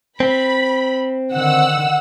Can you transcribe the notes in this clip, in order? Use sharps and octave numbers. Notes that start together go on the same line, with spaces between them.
C4 B5
D3 D#3 F#5 E6